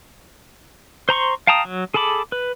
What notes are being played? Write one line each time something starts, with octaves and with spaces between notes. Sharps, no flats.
C5 A#5 C6 C#6
F5 G5 A5 A#5 D#6
F#3
G#4 A4 A5 B5 D6
B4